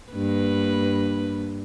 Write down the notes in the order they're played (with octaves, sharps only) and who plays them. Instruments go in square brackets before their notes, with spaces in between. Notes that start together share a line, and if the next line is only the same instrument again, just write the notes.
[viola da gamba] G2 A#3 B4